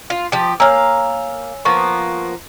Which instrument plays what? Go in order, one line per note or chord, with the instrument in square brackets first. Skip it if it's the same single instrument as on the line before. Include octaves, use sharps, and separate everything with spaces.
[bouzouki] F4
F3 G4
[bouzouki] A#3 F5 [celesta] C#5 G#5 E6
[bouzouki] F3 A#3 B3 [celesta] C#6